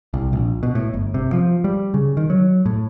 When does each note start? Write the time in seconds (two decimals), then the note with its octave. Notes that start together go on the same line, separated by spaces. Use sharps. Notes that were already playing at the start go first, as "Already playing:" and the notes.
0.14 C2
0.33 A#1
0.63 B2
0.75 A2
0.94 G1
1.14 C3
1.33 F3
1.64 G3
1.94 C#3
2.17 D#3
2.30 F#3
2.66 A2